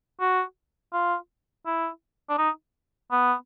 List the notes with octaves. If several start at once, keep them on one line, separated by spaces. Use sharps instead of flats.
F#4
F4
E4
D4
D#4
B3